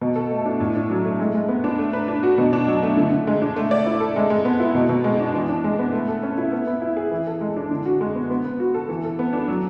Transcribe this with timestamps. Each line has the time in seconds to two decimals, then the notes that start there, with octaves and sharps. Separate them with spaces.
0.01 B2
0.16 A4
0.31 A3
0.46 D4
0.60 A2
0.75 D4
0.90 F#3
1.05 A3
1.19 G#3
1.35 G#3
1.49 B3
1.64 D4
1.78 A3
1.93 B4
2.08 D4
2.23 F#4
2.38 B2
2.53 D4
2.68 F#3
2.83 A3
2.97 D3
3.12 D3
3.27 G#3
3.42 D4
3.56 A3
3.71 D5
3.86 E4
4.00 A4
4.16 G#3
4.30 G#3
4.45 B3
4.60 E4
4.75 B2
4.89 B2
5.04 G#3
5.20 D4
5.34 E3
5.49 D4
5.64 G#3
5.79 B3
5.93 A3
6.08 A4
6.23 C#4
6.38 E4
6.52 B3
6.67 B3
6.82 E4
6.97 G#4
7.11 E3
7.27 A4
7.41 G#3
7.56 D4
7.71 D3
7.86 F#4
8.01 G#3
8.15 B3
8.30 B3
8.45 B3
8.60 F#4
8.74 A4
8.89 E3
9.04 A4
9.19 B3
9.33 D4
9.48 F#3